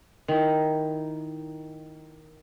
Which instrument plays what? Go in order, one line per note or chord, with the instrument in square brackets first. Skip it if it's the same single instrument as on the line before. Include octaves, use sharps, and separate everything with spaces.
[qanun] D#3 E4